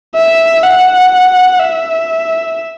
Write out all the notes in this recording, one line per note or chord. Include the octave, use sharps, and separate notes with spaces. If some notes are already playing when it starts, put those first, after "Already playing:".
E5
F#5
E5